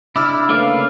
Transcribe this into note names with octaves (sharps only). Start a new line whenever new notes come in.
C#3 D4 E4 D6 E6 F6
A3 A#3 C#4 B4 D5 F5